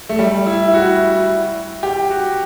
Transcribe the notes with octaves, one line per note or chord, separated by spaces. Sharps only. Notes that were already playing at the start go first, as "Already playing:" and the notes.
A3
G3
E4
E4
F#4
G4
F#4